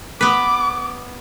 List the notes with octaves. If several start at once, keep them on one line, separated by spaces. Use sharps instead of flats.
B3 B4 D6